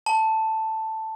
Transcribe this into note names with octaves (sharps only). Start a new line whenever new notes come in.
A5